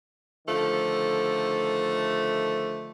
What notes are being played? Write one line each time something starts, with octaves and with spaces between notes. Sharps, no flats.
D3 D#3 F3 A3